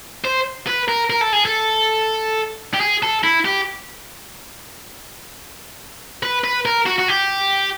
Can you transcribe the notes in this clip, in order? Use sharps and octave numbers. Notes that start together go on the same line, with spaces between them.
C5
B4
A#4
A#4
A4
G#4
A4
G4
G#4
A4
E4
G4
B4
B4
A#4
F#4
F#4
G4